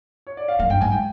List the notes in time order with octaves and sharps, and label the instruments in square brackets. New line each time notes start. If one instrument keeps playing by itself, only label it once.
[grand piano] C#5
D5
F5
[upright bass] F#2 [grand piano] F5
[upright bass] G2 [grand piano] G5
[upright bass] G#2 [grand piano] G#5
[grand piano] G5